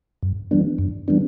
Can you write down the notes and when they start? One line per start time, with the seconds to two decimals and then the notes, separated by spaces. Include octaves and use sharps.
0.23 F#2
0.51 E3 G3 B3 D4
0.78 F#2
1.08 E3 G3 B3 D4